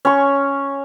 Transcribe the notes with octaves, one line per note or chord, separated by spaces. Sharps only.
C#4 C#6